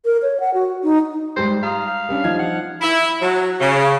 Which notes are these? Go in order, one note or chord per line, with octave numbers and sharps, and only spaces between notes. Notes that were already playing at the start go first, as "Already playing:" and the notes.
A#4
C#5
F#5
F#4
D#4
G#2 G3 C5
F5 A#5 D#6
G3 C#4 D4
F3 D#4 G#6
F#5
E4
F#3
C#3